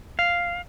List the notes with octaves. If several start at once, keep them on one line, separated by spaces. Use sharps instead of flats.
F5